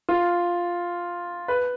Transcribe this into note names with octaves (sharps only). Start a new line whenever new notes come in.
F4
B4